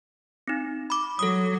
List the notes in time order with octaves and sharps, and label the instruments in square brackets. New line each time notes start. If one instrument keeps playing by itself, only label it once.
[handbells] C4 D#4
B5 D6
[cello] F#3 [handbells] A4 D#6